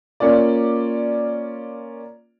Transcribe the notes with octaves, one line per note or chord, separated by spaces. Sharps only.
A#3 C#4 F4 D5